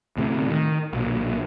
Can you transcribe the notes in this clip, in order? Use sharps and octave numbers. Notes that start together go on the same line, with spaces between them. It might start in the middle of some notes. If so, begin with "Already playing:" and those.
D2 A2 C3
D#3
B1 A#2